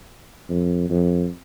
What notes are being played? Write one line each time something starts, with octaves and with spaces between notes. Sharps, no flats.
F2
F2